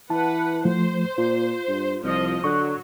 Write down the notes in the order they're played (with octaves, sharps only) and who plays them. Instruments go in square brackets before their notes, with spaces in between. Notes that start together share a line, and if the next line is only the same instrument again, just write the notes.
[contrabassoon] E3 [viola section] B4 F#5 [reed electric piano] A5
[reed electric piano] F3 A3 [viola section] C5
[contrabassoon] A#2 [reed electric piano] F4
[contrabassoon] G2
[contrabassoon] C2 [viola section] F3 D#5
[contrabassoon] D3 [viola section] F#3 [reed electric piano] C#6 F#6